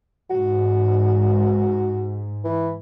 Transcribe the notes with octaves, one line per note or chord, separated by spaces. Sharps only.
G#2 F#4
E3